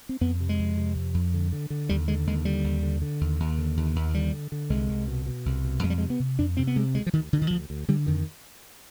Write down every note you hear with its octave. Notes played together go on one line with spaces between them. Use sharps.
C4
F2 B3
C3
G#3
F2
C3
F2
F2
D3
D3
D3
D#2 G3
D3 G#3
D#2 G#3
D3 G3
D#2
D3
D3
D#2
D#2
D3
D#2
D#2
D3 G3
D3
D3
C2 G#3
C2
B2
B2
C2
B2
F2 G#3
G3
G#3
C3
B3
C3
F2 D4
C3 C4
B3
C3 G#3
D2 G#3
F3
D2 D#3
D2 D3
D#3
D2 F3
D2
D3 G3
F2 D#3